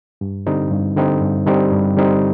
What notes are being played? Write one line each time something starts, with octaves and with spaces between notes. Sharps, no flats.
G2
D3 G3 C4 D#4
G2
D3 G3 C4 D#4
G2
D3 G3 C4 D#4
G2
D3 G3 C4 D#4